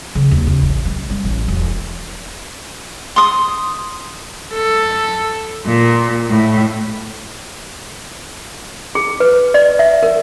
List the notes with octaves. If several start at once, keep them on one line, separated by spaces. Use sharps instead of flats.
C#3
D#2
C#3
A1
G#3
G3
A1
E1
C6 D#6
A4
A#2
A2
G#4
B4
D5
E5
A#4